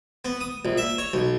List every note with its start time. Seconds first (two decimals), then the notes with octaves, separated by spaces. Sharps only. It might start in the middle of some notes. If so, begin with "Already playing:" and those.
0.25 B3
0.41 D#6
0.65 A#1
0.78 E5
0.98 C#5
1.13 B1